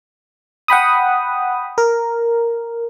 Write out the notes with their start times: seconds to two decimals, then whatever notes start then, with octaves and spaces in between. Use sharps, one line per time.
0.68 F#5 G5 B5 D#6
1.78 A#4